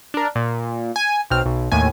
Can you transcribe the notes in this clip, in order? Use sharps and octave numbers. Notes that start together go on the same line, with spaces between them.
D4 A#4
A#2
G#5
B1 C4 F6
B1
D#2 A2 G#5